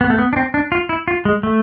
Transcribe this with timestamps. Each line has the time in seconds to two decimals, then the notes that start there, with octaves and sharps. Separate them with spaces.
0.01 B3
0.10 A3
0.18 B3
0.33 D4
0.36 C4
0.54 D4
0.72 F4
0.89 E4
1.08 F4
1.25 G#3
1.43 A3